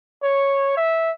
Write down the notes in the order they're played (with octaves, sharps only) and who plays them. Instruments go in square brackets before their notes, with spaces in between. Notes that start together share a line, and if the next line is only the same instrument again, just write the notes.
[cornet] C#5
E5